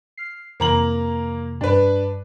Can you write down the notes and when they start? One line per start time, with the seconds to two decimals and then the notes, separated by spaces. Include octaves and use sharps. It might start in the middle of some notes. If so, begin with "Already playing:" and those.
0.18 F6 C7
0.60 F2 C3 E3 A#3 A#5 F#7
1.61 G2 D4 B4